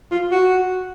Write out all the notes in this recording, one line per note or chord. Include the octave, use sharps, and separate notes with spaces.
F4
F#4